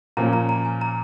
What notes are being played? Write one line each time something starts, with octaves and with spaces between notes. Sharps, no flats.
A#2 F3 A#3 C#4 A#5
A#5
A#5
G#5
A#5